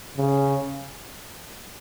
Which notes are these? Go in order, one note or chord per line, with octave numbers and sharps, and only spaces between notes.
C#3